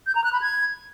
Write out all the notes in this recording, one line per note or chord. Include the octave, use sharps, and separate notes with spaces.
G6
A#5
F#6
B5
G#6